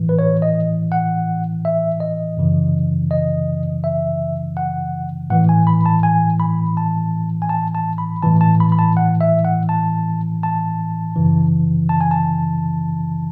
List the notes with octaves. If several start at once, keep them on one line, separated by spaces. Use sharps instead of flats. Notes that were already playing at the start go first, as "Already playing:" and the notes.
Already playing: A2 E3
B4
C#5
D#5
F#5
E5
D#5
F#2 C#3 E3
D#5
E5
F#5
A2 E3 F#5
G#5
B5
A5
G#5
B5
A5
G#5
A5
A5
B5
A2 E3 A5
A5
B5
B5
A5
F#5
E5
F#5
A5
A5
F#2 C#3 E3
A5
G#5
A5